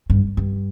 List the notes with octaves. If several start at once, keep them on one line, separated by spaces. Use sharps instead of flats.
G2
G2